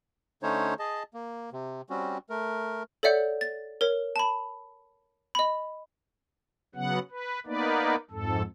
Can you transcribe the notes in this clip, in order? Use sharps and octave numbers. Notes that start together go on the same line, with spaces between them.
D3 A3 C#4 D#4 C5 C#5
G#4 D#5 A5
A#3
C3
G3 C4 C#4 F#4
A3 A#4
A4 C#5 D5 E5 F#5 G6
A6
A#4 C#5
A5 B5
D#5 B5
C#3 F#3 B3 F#5
B4
A#3 B3 D#4 B4 D5
F2 G#2 A4